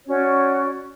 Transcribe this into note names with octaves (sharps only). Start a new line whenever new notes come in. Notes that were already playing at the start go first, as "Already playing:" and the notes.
C#4 F#4 C#5 D5